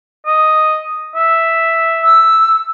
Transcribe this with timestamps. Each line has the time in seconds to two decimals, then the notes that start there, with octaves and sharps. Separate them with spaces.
0.26 D#5
1.15 E5
2.03 E6